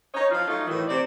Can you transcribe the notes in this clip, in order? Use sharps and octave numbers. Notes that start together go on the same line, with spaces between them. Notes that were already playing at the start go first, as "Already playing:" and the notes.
D#4 C#5
F3 F4
F#3 A3 D#4 F4
A2 D#3 E3
C3 C4 D5